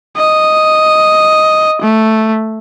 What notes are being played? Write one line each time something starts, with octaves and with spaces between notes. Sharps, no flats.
D#5
A3